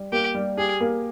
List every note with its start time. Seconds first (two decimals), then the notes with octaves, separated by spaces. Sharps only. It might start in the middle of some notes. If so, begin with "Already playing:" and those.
Already playing: G3
0.12 A#3 G4
0.35 G3
0.57 G4 G#4
0.81 A#3